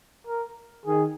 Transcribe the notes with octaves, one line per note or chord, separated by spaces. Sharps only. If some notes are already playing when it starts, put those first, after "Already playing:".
A#4
D#3 G#4